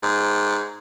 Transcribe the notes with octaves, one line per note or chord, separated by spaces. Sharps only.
G#2